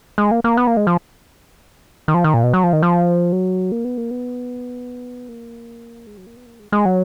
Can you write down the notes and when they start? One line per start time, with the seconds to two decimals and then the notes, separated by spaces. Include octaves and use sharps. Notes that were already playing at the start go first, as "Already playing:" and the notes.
0.18 G#3
0.31 A#3
0.44 A#3
0.57 B3
0.67 A#3
0.77 G#3
0.87 F3
2.08 D#3
2.14 F3
2.24 D#3
2.34 A#2
2.44 B2
2.54 F#3
2.64 F3
2.73 D#3
2.83 F3
3.32 F#3
3.72 A#3
3.85 B3
3.98 A#3
4.11 B3
5.29 A#3
6.07 G#3
6.17 F#3
6.26 A#3
6.37 B3
6.46 A#3
6.59 G#3
6.72 G#3
6.85 F#3